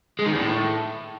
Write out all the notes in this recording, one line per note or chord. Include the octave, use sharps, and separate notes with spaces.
G#3
D#3
E2
A2